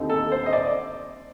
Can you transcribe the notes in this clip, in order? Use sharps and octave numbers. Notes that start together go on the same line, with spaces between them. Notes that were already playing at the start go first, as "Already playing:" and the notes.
Already playing: D#2 D3 A3 C4 D#4
A4
C5
D#5
D5